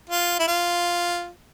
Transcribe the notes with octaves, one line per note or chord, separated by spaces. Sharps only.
F4
E4
F4